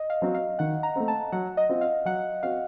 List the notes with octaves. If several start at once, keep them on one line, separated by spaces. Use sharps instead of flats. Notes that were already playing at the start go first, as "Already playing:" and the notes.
Already playing: D#5
F5
F#3 C4 F#4 C5
F5
D#3 F#5
A#5
A3 C4
A5
F#3 F#5
D#5
C4 F4
F5
F#3 F#5
C4 F#4 F5